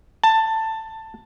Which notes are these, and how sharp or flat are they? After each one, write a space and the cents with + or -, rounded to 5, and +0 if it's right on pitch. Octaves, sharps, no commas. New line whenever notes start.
A5 +15